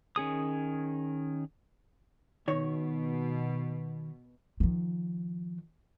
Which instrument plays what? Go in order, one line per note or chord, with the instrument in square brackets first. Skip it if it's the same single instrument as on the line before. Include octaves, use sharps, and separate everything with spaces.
[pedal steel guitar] D#3 C#4 G#4 D#6
[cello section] B2 [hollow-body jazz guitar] D#3 C#5
[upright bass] D#3 F3